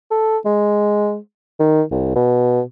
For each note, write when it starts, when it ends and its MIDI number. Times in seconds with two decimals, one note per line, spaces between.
0.11 0.37 69
0.45 1.17 56
1.59 1.82 51
1.91 2.16 36
2.16 2.61 47